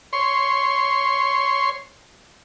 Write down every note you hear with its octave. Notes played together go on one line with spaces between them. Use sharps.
C#5 C6